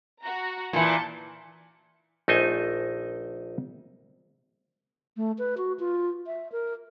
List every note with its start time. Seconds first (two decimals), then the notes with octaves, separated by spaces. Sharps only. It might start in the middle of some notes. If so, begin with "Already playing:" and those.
0.22 F#4 A#5
0.73 A#2 E3 A5 G6 C#7
2.28 A#1 A3 D#4 C5 D#5 G#5
5.17 A3
5.38 B4
5.58 F#4
5.79 F4
6.27 E5
6.52 A#4